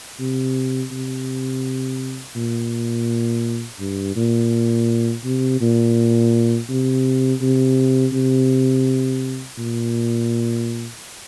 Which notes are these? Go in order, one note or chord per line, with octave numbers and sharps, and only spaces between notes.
C3
C3
A#2
G2
A#2
C3
A#2
C3
C3
C3
A#2